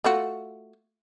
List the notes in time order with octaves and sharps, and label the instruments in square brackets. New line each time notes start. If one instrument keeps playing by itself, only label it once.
[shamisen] A3 F4 F#4